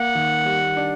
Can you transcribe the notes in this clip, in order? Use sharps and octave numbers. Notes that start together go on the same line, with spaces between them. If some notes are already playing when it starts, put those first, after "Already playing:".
Already playing: A#3 F#5
D#3
G3
D4